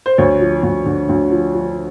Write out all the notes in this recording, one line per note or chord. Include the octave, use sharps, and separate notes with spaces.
C5
D2 C#5
F3
D2
D3
D2
F3
F3